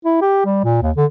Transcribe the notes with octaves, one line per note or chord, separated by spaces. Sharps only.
E4
G4
G3
A#2
D#2
D3